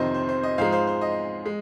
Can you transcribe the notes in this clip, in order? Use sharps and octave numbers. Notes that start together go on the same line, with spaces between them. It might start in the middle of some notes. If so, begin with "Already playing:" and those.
Already playing: F2 C3 D#3 C5 D#5
C5
C5
D#5
G#2 F3 G#3 C5 F5
C5 F5
C5
D#5
G#3